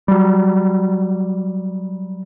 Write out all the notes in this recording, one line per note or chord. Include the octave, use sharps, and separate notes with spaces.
F#3 G3